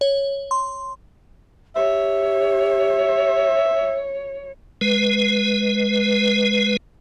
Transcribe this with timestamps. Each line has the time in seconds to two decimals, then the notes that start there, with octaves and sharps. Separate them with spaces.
0.01 C#5
0.51 C6
1.76 G4 C#5 E5
4.81 G#3 B4